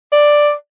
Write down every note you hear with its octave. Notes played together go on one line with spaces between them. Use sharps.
D5